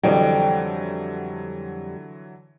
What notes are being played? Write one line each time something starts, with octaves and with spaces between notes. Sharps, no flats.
F2 D3 E3 F#3 G3 G5